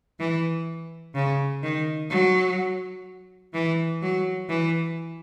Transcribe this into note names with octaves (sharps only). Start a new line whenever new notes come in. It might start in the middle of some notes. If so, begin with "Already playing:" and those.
E3
C#3
D#3
F#3
E3
F#3
E3